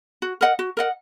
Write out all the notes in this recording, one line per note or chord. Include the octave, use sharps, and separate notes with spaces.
F#4
A#4 D#5 F#5
F#4
A#4 D#5 F#5